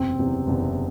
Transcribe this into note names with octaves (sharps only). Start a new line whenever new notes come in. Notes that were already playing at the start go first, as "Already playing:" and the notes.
Already playing: F#1 E2 C3 C4
F#1 E2 C3
F#1 E2 C3